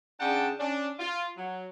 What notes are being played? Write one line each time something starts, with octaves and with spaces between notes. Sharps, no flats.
C#3 D4 F#5 G5 A5
C#4 D4
F4
F#3